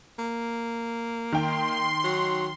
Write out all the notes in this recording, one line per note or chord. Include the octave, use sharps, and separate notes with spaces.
A#3
D#3 G5 C6
F#3